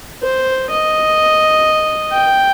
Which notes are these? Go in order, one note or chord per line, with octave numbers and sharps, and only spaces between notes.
C5
D#5
G5